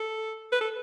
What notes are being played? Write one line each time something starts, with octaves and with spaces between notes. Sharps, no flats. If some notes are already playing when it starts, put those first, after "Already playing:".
Already playing: A4
B4
A4